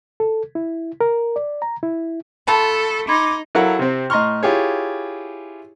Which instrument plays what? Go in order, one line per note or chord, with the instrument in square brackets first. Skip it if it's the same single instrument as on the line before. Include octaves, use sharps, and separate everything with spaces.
[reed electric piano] A4
E4
A#4
D5
A#5
E4
[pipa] A3 F4 A5 [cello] A4 [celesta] B5
[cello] D#4 [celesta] B5 C6 G#6 [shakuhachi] D6
[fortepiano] F#3 E4 A4 A#4 F5 F#5
C3 C4
A2 D#5 A#5 C6 C#6 F6
E4 F4 G4 G#4 C#5